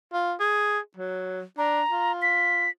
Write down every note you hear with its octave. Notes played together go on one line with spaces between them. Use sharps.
F4
G#4
F#3
D4 A#5
F4
B6